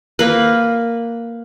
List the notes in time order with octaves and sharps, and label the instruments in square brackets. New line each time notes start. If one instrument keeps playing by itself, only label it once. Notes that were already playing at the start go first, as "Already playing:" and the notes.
[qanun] A#3 B4